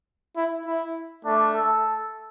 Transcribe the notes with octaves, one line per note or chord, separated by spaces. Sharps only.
E4
E4
A3 D4
A4